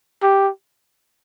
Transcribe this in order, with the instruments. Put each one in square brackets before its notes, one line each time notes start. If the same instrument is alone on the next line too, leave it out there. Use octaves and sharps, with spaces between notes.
[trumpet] G4